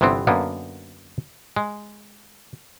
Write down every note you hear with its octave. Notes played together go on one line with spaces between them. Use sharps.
G1 C3 E3 B3 C4
F#2 D3 A#3 B3
G#3